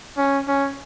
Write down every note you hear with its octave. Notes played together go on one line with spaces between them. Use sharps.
C#4
C#4